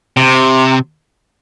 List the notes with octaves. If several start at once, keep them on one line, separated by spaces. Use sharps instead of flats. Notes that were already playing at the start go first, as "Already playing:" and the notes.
C3